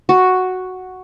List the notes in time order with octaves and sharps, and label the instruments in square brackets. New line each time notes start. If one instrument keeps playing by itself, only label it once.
[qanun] F#4